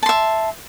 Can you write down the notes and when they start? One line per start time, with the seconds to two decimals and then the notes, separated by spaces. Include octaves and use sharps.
0.03 A5
0.06 C6
0.09 E5